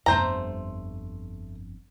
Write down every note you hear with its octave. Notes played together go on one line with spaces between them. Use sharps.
G1 F2 A3 C5 A#5